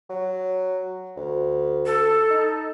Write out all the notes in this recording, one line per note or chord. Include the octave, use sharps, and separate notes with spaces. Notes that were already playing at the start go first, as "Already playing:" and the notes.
F#3
D2
A4
D#4